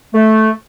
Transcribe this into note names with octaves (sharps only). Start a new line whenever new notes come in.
A3